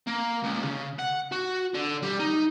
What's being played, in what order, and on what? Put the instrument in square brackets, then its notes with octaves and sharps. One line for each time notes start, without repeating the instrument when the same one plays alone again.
[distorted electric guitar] A#3
C#2
C#3
F#5
F#4
D3
G3
D#4